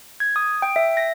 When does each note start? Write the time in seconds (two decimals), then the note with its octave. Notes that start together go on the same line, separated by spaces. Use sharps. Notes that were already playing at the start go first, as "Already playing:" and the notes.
0.20 G#6
0.36 D#6
0.62 G5
0.76 E5
0.97 A#6